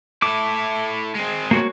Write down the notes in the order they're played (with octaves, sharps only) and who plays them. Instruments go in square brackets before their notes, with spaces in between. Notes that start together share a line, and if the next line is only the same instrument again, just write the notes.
[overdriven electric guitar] E4 A4 [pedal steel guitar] D6
[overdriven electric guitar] G#3 C4
[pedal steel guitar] A#3 F#4 C#5